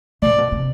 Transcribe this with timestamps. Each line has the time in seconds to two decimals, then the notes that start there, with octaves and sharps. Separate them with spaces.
0.22 B2 D5
0.30 A2
0.38 B2
0.52 C3